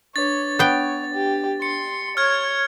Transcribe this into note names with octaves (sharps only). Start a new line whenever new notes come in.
D4 B4 C#5 A6
B3 C#5 G5
G4
C6 C#7
C#5 F6 G#6